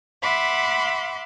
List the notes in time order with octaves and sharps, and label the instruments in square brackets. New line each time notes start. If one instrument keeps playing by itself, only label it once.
[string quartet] E5 F#5 B5 C6 D6